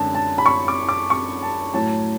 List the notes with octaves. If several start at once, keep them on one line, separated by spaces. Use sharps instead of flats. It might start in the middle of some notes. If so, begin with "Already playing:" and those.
Already playing: F#2 D3 G#3 A5
A5
B5
C#6
D6
D6
C#6
A5
A2 F#3 A5